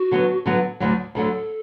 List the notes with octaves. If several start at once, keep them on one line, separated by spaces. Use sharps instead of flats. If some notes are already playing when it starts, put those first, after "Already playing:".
Already playing: F#4
D3 F#3 B3
D3 F#3 B3
D2 D3 F#3
D2 D3 F#3 A4